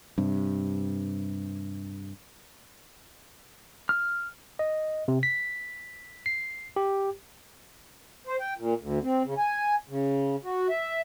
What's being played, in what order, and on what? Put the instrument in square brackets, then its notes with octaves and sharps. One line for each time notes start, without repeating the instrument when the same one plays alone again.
[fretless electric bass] G2 C3
[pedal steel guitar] F6
[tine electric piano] D#5
C3
B6
C7
G4
[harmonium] C5
G5
A#2
D2
C4
C#3
G#5
C#3
F#4
E5